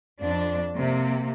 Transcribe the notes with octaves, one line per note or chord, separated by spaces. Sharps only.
F2 D4
C3 A#3